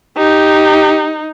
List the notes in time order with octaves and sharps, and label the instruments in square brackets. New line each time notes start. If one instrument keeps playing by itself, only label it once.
[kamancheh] D#4 [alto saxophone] G4